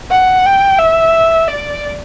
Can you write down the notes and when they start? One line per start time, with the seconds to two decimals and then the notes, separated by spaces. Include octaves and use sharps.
0.11 F#5
0.46 G5
0.78 E5
1.48 D5